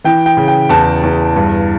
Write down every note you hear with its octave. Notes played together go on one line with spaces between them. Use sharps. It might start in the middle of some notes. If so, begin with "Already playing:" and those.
E3 G5
G5
C#3
G5
E2 A5
E2
G2